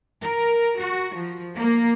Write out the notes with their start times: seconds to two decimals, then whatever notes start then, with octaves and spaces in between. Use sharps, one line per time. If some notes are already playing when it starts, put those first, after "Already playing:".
0.22 A#4
0.78 F#4
1.14 F3
1.56 A#3